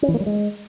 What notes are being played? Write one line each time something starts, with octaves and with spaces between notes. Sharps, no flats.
C#4
E3
A#3
G3
G#3